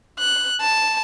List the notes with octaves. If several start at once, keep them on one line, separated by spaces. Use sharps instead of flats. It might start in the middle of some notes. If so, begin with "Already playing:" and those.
F#6
A5